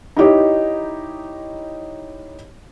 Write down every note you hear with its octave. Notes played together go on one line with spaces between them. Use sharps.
D#4 E4 G4 C#5 D#5